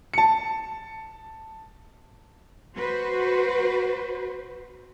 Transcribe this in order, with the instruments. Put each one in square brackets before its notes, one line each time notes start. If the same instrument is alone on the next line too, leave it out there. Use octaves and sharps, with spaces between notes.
[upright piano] A5 C#7
[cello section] F#4 B4 C5